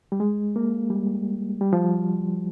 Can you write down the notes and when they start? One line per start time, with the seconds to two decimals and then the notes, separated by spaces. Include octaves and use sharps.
0.12 G3
0.20 G#3
0.56 A#3
0.90 G3
1.61 G3
1.73 F3